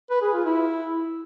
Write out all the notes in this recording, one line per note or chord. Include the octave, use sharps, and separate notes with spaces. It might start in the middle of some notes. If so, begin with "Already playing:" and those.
B4
G#4
F4
E4